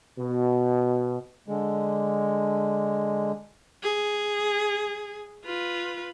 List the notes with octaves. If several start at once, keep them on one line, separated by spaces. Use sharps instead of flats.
B2
D3 G#3
G#4
F4 B4